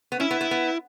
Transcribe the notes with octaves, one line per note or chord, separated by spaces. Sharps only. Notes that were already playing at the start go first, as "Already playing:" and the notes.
B3
C#4 E4
B3
B3
B3